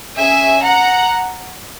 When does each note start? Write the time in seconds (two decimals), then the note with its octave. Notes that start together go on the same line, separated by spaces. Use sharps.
0.17 C#4 G#4 E5 G#5
0.63 F#5 A#5